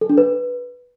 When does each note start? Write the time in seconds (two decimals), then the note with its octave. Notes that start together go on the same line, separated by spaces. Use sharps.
0.01 A4
0.09 D4
0.18 B4